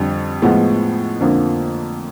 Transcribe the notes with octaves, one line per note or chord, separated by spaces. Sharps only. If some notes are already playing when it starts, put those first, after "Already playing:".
Already playing: F2 D3 G3
A2 F3 G#3 B3
F2 D3 F3 A#3